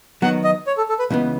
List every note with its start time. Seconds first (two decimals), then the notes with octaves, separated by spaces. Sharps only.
0.22 D#3 F#3 B3 F#5
0.44 D#5
0.67 C#5
0.77 A4
0.89 A4
0.99 B4
1.10 C#2 C#3 E3 B3